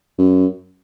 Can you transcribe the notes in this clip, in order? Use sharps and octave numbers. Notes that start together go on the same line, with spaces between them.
F#2